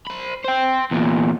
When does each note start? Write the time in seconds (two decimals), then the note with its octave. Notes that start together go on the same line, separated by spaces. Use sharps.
0.07 C5 B5
0.45 C5 G5
0.91 E2 A#2